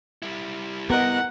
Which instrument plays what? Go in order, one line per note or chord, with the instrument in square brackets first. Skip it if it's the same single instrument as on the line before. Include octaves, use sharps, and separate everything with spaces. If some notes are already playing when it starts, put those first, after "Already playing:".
[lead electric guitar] G3 E4
[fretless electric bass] B3 [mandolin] A#4 D#5 [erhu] F#5